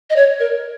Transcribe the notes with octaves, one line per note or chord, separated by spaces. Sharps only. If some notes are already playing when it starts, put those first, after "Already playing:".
D#5
C#5
A#4